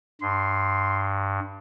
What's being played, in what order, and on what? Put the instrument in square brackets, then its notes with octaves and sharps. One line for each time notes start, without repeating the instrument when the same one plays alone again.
[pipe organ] G2 [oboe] C6